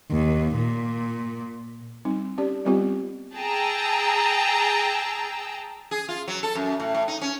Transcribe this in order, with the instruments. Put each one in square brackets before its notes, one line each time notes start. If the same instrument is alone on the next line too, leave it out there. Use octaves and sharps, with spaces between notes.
[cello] D#2
A#2
[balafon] G3 C4 D#4
C#4 G4 D5
G3 B3 C4 F4 G4
[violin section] G#4 G5 A5 A#5 E6
[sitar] G#4
F4
F#3
A4
F#2
A2
A2
D#4
C#4